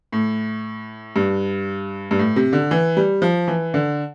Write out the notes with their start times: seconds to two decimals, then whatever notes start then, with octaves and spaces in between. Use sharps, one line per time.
0.12 A2
1.16 G2
2.11 G2
2.19 A2
2.36 C3
2.53 D3
2.71 E3
2.97 G3
3.22 F3
3.48 E3
3.74 D3